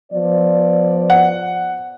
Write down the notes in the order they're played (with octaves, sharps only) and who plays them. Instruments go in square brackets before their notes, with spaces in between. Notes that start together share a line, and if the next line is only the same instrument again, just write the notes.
[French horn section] F3 B3 D5
[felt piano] F#5